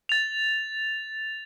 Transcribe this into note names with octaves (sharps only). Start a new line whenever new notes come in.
A6 F7